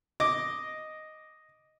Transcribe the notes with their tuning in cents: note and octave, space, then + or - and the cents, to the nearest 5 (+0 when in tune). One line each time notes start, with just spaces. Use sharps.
D#5 +0 D6 +0